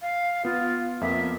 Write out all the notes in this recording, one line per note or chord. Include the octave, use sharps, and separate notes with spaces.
F5
B3 F4
F2 A#3 B3 E5